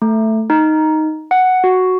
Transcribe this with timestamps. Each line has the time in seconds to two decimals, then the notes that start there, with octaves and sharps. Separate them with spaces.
0.02 A3
0.50 D#4
1.31 F#5
1.64 F#4